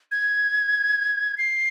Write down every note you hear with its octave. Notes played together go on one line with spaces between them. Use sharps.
G#6
C7